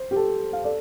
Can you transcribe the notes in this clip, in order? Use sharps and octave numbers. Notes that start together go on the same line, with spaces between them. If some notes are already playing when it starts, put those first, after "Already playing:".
Already playing: C5
G4
A4
F5
A4 D5